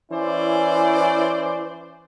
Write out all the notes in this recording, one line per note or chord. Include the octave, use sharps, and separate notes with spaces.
E3 C#4 E4 C5 D5